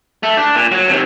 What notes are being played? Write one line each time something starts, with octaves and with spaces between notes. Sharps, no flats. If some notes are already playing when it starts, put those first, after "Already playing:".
A3
D4
A#2
F#3
C3 D#3